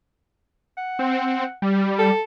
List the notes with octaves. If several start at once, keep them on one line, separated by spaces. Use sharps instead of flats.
F#5
C4
G3
A4